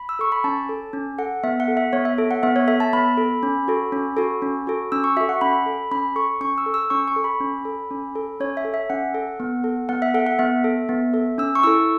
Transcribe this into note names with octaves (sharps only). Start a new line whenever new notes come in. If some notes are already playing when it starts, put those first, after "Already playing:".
Already playing: B5
E6
A4 C#6
B5
C#4 A5
A4
C#4
A4 F#5
B3 E5
F#5
A4
E5
B3 C#5
E5
A4
F#5
B3 E5
C#5
A4 E5
A5
B3 B5
A4
C#4
F#4 A4
C#4
F#4 A4
C#4
F#4 A4
C#4 E6
C#6
F#4 A4 E5
F#5
C#4 B5
A4
C#4 B5
A4 C#6
C#4 C#6
E6
A4
E6
C#4 C#6
C#6
A4
B5
C#4
A4
C#4
A4
C#4 C#5
E5
A4
E5
C#4 F#5
A4
B3
A4
B3 F#5
E5
A4 F#5
F#5
B3 E5
A4
B3
A4
C#4 E6
C#6
E4 A4 E6